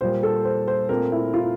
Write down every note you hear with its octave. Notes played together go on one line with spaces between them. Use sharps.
A#2 G3 A#3 C5
A4
C5
C5
A#2 A3 C4 A#4
E4
F4